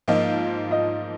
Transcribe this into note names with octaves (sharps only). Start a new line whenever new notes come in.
G#2 F3 A#3 F4 D#5
D#5